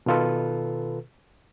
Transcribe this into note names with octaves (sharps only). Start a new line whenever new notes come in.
B2 D#3 F4 A4 B4